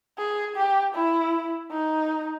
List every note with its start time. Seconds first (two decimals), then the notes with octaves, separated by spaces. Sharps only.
0.18 G#4
0.56 G4
0.95 E4
1.71 D#4